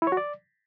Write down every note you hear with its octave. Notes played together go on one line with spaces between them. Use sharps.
E4
C#5
F#4
D5